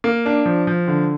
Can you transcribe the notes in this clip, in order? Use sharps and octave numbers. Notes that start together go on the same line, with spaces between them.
A#3
D4
F3
F3
D3